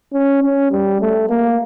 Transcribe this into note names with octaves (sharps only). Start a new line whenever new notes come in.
C#4
C#4
G3
A3
A#3